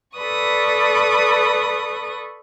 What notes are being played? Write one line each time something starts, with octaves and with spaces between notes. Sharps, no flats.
A4 B4 D5 B5 C#6 D#6